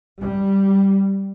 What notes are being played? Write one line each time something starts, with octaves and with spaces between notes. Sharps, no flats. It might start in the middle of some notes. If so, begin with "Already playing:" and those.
G3